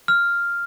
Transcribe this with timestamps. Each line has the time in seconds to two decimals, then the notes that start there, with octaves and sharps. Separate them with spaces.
0.08 F6